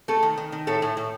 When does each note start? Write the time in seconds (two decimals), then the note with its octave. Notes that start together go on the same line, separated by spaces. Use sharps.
0.08 A3 A4
0.23 D#3
0.38 D#3
0.52 D#3
0.67 A2 A4
0.82 A2
0.97 A2